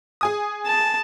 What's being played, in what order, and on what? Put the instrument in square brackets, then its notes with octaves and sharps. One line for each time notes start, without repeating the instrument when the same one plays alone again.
[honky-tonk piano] G#4 G#5 D#6
[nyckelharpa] A5